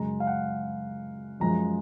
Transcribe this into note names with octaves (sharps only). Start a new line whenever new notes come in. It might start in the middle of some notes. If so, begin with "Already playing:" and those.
Already playing: F#2 C#3 G#3 A#5
F5
F#5
F#2 F3 G#3 A#5